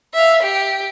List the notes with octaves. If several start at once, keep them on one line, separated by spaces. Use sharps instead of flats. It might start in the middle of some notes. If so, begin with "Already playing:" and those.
E5 F5
G4